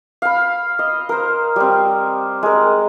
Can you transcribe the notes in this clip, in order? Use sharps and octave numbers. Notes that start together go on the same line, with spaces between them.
F5 B5
D#5
A#4 C5
G3 C4
G#3 A#4